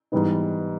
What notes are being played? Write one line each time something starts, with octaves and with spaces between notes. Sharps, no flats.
G#2 E3 G3 B3 D#4